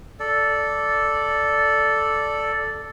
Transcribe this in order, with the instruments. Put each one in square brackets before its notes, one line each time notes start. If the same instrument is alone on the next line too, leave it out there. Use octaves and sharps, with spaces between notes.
[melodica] A4 D5